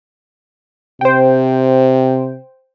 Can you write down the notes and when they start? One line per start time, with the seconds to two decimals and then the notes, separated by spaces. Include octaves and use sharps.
1.01 C3 C5 G5